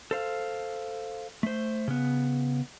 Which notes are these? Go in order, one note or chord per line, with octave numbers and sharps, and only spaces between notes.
A4 C5 F5
A3 C5
C#3 B3